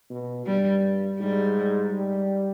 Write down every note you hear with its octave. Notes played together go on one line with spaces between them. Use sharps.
B2
G2 G3
G#2 G3
G3